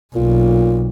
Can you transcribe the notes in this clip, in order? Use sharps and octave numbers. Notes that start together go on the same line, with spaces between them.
B1 A#2